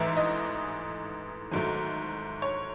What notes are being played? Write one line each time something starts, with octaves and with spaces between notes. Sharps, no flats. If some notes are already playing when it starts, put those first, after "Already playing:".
Already playing: A1 G#2 E3 A3 E5
D#5
G#1 G#2 F#3 A3
C#5